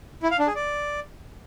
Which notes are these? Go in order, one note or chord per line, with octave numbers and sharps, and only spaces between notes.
E4
F5
D4
G#4
D5